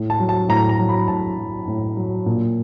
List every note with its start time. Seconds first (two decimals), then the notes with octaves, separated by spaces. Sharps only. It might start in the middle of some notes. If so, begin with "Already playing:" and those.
Already playing: A2
0.10 A5
0.20 F#3
0.29 A5
0.48 A2 A#5
0.69 A#5
0.79 F#3
0.89 B5
1.08 A2 A5
1.38 F#3
1.68 A2
1.97 F#3
2.26 A#2